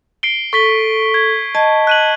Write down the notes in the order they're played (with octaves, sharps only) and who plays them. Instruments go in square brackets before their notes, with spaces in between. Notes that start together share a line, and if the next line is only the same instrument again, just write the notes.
[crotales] C7 D7 G7
[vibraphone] A4 [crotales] C#6 B6 G7
[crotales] G#6
[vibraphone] D#5 A5 [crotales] G#6
[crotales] F#6 D#7 F#7